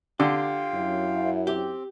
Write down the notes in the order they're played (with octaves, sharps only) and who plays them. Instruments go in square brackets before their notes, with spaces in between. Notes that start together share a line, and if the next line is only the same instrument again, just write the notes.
[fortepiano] D3 [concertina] F4 F5 G5 [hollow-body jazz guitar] G4
[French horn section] F#2 E4
[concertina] C4 [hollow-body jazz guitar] G4